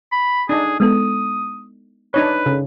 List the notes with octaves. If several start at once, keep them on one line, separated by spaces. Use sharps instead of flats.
B5
D4 D#4 G#4
G#3 B3 A4 D#6
D4 D#4 B4 C#5
C#3